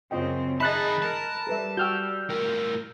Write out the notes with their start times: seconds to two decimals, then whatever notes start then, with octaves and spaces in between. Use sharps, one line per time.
0.11 F#2 C#3 C4 F4 D#5 G5
0.60 D#3 D#4 G#4 E5 A5 B5 F#6 A6
1.02 A#4 A5
1.47 G3 A4 B4 E5
1.77 F#4 G5 E6 F6 G6
2.30 A2 A#4 G5